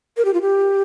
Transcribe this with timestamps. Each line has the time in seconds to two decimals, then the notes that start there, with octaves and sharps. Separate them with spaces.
0.17 A#4
0.25 G4
0.34 F4
0.41 G4